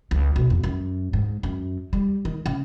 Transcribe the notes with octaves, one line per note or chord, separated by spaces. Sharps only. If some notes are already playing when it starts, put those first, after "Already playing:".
C#2
B1
F2
F#2
G#2
F#2
G3
D#3
C#3